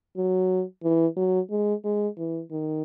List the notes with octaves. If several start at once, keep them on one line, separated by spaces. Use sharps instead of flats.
F#3
E3
F#3
G#3
G#3
E3
D#3